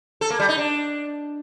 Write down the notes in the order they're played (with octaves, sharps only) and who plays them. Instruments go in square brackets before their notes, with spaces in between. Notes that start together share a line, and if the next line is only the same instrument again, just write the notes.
[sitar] A4
A#3
G3
D#4
D4